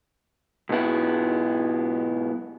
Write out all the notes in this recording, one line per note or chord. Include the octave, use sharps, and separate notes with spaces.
B1 G#2 B3 E4